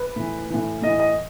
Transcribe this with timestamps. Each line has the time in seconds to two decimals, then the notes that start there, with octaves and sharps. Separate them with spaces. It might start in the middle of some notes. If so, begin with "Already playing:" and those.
Already playing: B4
0.16 A2 E3
0.50 A2 E3
0.82 A2 E3 D#5
0.99 D#5